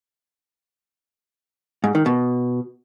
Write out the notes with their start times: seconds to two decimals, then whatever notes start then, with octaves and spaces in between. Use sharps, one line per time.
1.84 G#2
1.95 D#3
2.06 B2